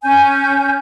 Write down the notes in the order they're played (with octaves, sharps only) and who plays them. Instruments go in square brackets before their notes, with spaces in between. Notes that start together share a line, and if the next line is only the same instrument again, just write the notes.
[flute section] C#4 G#5 G6